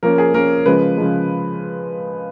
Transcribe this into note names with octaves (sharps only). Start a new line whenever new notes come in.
F3 A#3 C#4 A#4
G#4
F3 A#3 C#4 A#4
C#3 F3 G#3 B4
C#3 F3 G#3